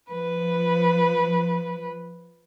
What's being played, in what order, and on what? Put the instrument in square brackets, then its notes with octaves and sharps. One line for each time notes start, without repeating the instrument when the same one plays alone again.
[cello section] F3 [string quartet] B4